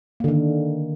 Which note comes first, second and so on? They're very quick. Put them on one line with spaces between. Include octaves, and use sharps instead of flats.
A#3 D3 D#3